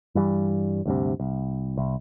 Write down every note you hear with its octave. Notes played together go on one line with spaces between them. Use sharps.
G2 E3 G3
D2 G2 C3
C2
C2